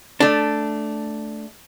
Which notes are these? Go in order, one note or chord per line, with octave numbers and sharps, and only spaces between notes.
A3 D4